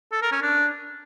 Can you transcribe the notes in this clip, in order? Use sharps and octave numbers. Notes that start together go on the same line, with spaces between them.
A4
A#4
C#4
D4